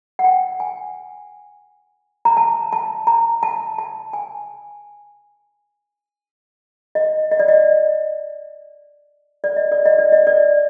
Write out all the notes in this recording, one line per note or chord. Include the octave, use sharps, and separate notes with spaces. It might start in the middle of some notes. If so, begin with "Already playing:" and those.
F#5
G5
G#5
A#5
A5
A5
A#5
A5
A5
G#5
D#5
D#5
D5
D#5
D5
D#5
D5
D#5
D5
D#5
D5